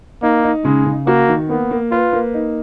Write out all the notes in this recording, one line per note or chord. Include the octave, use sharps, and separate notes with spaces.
A#3 D#4
D#4
C#3 G#3
C#3
A#3 F#4
D#3
A#3 B3
A#3
F4 B4
A#3
D#4